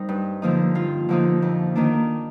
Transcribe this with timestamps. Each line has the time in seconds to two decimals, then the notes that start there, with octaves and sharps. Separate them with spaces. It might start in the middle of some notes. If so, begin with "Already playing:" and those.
Already playing: G3 C4 D#4 A#4
0.09 G2
0.42 D3 F3 A#3 D#4
0.75 G2 F4
1.09 D3 F3 A#3 D#4
1.42 F2
1.75 D#3 A#3 D4